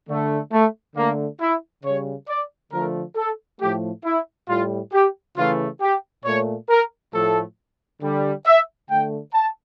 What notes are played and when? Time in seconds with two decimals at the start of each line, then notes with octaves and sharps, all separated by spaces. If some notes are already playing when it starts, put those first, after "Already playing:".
0.08 D3 A3
0.52 A3
0.96 D3 A3 A#3
1.40 E4
1.84 C#3 G3 C#5
2.28 D5
2.72 D3 F3 A3 A#4
3.17 A4
3.60 A2 F3 A3 G4
4.05 E4
4.49 A2 G3 F4
4.93 G4
5.37 C#3 E3 A3 F4
5.81 G4
6.25 A#2 A3 C#5
6.69 A#4
7.13 A2 F3 A3 A4
8.02 D3 G3
8.46 E5
8.90 D3 A3 G5
9.34 A5